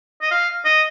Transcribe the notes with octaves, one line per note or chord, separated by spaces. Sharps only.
D#5
F5
D#5